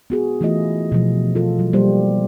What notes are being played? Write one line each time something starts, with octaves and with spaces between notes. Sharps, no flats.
B3 F#4 G#4
E3 A3 E4 F4 D#5
B2 F3
F4 A4
F#3
G3 A#3 C5